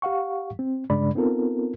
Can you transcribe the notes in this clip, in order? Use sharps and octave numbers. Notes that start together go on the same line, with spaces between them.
G4 F5 F#5 C#6
C4
G2 C#3 G#3 D4 D5 B5
B3 C4 D#4 F4 A4 A#4